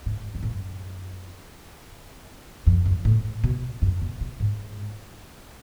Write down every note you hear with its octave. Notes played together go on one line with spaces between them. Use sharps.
G#2
F#2
G#2
F#2
F2
F#2
A2
B2
F#2
B2
B2
G#2